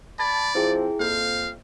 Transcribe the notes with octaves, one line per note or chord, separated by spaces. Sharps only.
D5 A5 B5 G#6 A6
F3 C4 E4 G#4 G5
F2 A#3 F5 G6